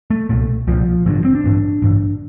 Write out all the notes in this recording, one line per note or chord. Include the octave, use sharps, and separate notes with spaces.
A3
C2 A#2 A3
C2 A#2 F3
A1 G2 D3 E3
C4
D4
A1 G2 D3
A1 G2 D3